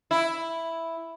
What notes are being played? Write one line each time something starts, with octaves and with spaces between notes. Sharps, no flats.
E4